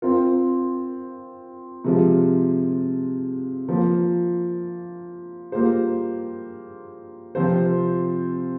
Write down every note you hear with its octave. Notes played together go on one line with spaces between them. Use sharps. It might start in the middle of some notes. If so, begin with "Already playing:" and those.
C4 F4 A#4
C3 F3 G#3
F3 A#3 F4
G3 A#3 F4 G#4 C5
C3 F3 C4 F4 C5